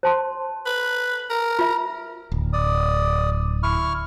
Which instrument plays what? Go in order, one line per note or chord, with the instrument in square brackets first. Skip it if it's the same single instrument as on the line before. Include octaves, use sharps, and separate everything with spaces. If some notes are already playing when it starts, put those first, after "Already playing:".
[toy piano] C5 A5 C6
[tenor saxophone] B4
A#4
[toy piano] F4 E5
[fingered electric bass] D1
[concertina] D5 D#6
E4 C#6 F6